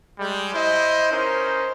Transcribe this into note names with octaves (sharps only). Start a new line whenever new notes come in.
G3 G#3
E4 C5 D#5
C#4 D#4 A#4 C5